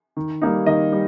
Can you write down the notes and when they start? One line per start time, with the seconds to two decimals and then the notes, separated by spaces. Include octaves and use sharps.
0.17 D#3
0.42 G3 A#3 D#4
0.66 D#3 D#5
0.92 G3